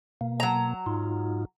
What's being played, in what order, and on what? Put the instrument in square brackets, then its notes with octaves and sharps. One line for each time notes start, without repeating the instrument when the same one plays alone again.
[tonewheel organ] B2 A#3
[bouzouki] F#3 A#5
[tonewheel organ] G#2 D#4 F4